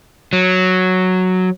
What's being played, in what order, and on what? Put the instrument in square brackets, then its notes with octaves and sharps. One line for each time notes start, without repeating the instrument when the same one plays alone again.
[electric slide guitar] F#3